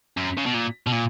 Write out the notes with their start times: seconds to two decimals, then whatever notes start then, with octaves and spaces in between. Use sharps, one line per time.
0.17 F#2
0.38 C#3
0.46 B2
0.54 A#2
0.87 B2
0.92 A#2